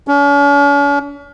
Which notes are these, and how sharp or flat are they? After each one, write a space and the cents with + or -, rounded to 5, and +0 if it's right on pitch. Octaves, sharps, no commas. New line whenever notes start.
C#4 +45